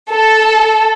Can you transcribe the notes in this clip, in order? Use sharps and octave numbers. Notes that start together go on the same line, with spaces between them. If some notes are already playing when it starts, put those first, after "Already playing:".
A4